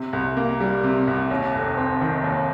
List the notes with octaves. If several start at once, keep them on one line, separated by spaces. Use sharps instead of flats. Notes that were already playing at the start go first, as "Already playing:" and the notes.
Already playing: C3
C2
A#3
G3
C3
C2
D#2
F1
C4
D#3
D#2